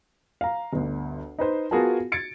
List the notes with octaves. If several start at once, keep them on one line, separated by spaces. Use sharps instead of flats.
F5 A#5
G1 D2
D#4 B4 C5
B3 F4 F#4 G#4 A#4 A5
G#6 A6 C#7 D7